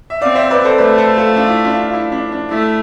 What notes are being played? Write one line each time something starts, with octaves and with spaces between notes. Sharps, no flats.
E5
C4 D5 F5
C5 E5
B4 D5
A4 C5
A3 B4 D5
A4 C5
F4 A4
D4 F4
E4
D4 F4
F4
E4
D4
D4
A3 E4